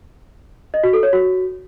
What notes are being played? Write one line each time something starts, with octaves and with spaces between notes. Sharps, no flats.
D#5
F#4
A4
C#5
F#4